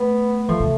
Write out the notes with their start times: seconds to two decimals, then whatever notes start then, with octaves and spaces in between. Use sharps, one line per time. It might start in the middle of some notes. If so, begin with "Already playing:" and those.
Already playing: A3 B3
0.49 F3 A3
0.60 C3